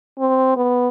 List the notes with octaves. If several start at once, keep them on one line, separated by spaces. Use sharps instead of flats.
C4
B3